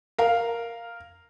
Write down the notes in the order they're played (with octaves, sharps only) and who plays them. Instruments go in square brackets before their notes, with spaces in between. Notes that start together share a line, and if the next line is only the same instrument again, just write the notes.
[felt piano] A#4 F5